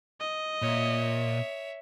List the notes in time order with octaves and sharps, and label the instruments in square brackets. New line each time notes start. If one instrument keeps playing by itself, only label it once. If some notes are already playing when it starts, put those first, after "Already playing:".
[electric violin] D#5
[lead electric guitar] A#2 [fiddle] C#5 E5